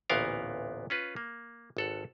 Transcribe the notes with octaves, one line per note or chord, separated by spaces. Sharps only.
A1 D2 A#2 B3 A#4 F5
C#4 F4 B4
A#3
G#1 A4 F#5